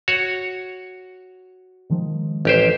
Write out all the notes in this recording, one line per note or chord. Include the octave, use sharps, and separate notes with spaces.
F#4 C#5
D#3 F3 G#3
A1 G4 C5